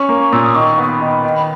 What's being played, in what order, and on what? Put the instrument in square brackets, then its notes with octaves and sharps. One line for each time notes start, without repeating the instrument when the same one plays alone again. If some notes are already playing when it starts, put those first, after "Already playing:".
Already playing: [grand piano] C#4 [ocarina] C#6
[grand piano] A#3
[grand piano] A#2 [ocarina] E6
[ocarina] D#6
[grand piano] D#3 [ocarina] C#6
[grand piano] B3
[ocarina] C#6
B5
[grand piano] D#3
D#3